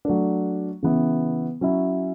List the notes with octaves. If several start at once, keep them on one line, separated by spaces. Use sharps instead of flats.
F#3 A3 D4
C#3 E3 B3 E4
F#3 C#4 E4